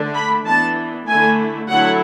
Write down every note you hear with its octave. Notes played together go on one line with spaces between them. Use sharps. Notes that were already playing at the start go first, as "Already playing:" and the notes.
Already playing: D3 A3 D4
B5
E3 B3 D4 A5
D3 A3 E4 G#5
D3 F#3 A3 E4 F#5